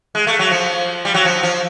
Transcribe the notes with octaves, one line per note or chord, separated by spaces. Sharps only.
G#3
A3
F#3
F3
G3
F#3
F3
F3